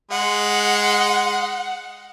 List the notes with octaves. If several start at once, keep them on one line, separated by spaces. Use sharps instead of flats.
G#3 F#5